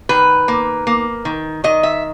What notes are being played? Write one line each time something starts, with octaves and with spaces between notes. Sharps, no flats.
D#3 B4
A#3
A#3
D#3
D#3 D#5
E5